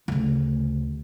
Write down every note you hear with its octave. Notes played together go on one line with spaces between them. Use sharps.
D2 C#3